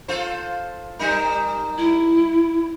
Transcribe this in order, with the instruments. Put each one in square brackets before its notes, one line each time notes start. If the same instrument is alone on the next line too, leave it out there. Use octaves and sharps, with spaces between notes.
[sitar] F4 A4 C5
G3 D#4 A#4
[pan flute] E4